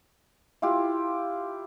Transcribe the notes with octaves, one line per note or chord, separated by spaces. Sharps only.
E4 F4 G4